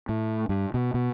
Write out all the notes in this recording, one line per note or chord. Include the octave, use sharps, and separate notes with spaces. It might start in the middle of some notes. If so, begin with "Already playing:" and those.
A2
G2
B2
B2